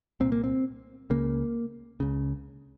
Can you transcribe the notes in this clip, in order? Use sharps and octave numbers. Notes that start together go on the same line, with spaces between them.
C2 A#2 C4
A#3
C4
C#2 C#3 A#3
C#2 C#3